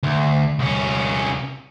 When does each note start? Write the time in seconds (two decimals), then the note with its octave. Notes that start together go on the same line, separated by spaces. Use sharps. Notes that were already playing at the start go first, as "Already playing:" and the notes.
0.03 D2
0.59 C2 C#4